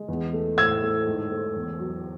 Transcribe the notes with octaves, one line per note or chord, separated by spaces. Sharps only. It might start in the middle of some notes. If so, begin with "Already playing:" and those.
Already playing: G#3
E2
A3
A2 E6 G#6
A3
G#2
A3
E2
F#3